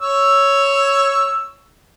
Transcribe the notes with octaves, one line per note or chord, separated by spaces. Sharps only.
C#5 E6